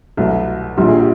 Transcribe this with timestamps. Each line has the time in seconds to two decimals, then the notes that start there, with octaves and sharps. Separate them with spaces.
0.17 C2 B2 F#3 A3
0.77 A#1 A#2 G3 G4
0.88 G#4
0.99 G4